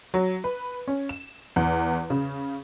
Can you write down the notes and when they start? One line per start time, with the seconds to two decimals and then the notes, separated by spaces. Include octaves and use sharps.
0.14 F#3
0.44 B4
0.88 C#4
1.09 E7
1.56 E2
2.10 C#3